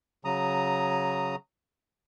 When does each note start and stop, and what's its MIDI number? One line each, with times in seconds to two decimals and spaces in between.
0.25 1.36 49
0.25 1.36 54
0.25 1.36 82
0.25 1.36 87